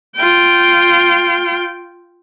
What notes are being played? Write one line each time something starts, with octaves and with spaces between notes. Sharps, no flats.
F4 G5